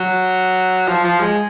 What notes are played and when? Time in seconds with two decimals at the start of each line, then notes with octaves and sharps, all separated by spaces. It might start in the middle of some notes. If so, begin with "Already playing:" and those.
Already playing: F#3
0.88 F3
1.04 F3
1.20 G#3